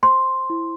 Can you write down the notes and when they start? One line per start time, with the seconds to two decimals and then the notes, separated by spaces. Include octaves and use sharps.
0.03 C5 C6
0.50 E4